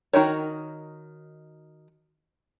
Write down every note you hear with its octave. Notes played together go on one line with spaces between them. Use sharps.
D#3 D#4 F#4 A#4 C#5